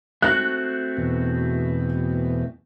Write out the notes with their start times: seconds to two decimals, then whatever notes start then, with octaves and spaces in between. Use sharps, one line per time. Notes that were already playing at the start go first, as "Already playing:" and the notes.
0.22 A3 C4 F#4 F#6
0.97 E2 B2